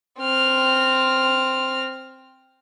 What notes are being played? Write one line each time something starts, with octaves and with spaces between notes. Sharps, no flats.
C4 F6